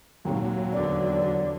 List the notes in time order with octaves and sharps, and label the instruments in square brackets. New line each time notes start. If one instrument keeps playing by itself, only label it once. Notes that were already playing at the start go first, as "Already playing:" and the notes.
[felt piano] G#1 D#2 [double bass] A#2 [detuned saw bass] F#3
[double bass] E2 D3 [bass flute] D5